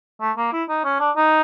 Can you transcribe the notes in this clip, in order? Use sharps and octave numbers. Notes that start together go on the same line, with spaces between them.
A3
A#3
E4
D#4
C#4
D4
D#4